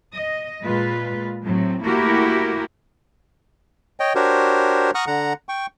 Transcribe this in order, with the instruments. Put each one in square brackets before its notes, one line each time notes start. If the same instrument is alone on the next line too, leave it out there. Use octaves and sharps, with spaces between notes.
[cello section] D#5
A#2 G#3 F4 B4
A2 F#3 C4
A3 A#3 E4 F#4 G4 A#4
[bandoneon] C#5 D#5 G5
D4 F#4 G4 A#4 C5 C#5
F#5 A#5 C#6 D#6 F6 F#6
D3 F#5 A#5
G5 C#6